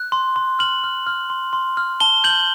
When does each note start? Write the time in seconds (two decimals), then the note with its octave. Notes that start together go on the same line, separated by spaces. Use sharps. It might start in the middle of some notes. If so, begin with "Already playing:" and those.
Already playing: F#6
0.12 C6
0.36 C6
0.59 F6 F#7
0.84 F6
1.07 F6
1.30 C6
1.53 C6
1.77 F6
2.00 A5 G7
2.24 G6 F#7